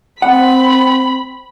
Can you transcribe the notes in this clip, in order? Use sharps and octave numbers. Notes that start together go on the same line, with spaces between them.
C4 F#5 B5